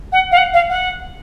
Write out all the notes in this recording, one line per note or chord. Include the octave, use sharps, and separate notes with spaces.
F#5
F5
F#5
F5
F#5